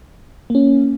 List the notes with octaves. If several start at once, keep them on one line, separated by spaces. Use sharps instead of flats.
A#3
C#4